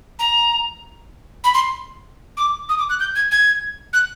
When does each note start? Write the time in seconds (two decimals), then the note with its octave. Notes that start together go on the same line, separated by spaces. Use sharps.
0.19 A#5
1.44 B5
1.54 C6
2.37 D6
2.69 D#6
2.78 D6
2.89 F#6
3.00 G6
3.15 G#6
3.31 G#6
3.93 F#6